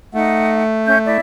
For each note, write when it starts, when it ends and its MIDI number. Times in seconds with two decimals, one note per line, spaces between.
0.14 1.17 57
0.14 0.63 63
0.14 0.63 78
0.86 0.98 61
0.86 0.98 76
0.86 0.98 91
1.06 1.20 64
1.06 1.20 74
1.06 1.20 76